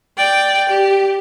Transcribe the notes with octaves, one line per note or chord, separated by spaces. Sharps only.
D5 G5
G4